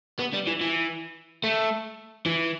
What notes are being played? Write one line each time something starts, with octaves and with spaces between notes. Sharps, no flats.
B3
G3
E3
E3
A3
E3